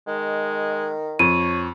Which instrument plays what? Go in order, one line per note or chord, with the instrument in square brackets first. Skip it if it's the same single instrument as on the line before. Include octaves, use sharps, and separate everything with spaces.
[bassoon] D#3 [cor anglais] G#3
[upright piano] F2 [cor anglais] C#5 [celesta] D#7